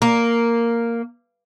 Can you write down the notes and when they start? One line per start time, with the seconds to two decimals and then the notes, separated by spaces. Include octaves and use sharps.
0.02 A#3